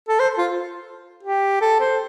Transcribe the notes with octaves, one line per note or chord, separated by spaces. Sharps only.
A4
C5
F4
G4
A4
C5